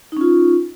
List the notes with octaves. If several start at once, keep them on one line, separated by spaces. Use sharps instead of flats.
C#4 D#4 F4